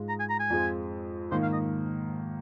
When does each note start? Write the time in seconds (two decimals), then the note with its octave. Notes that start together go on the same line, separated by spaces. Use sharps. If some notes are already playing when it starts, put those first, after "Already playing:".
Already playing: G#2 G#3 F4
0.09 A#5
0.20 G#5
0.30 A#5
0.40 G#5
0.50 F2 F3 G#3 C4 F4
1.31 G#2 D#3 A#3 C5
1.42 F5
1.53 D#5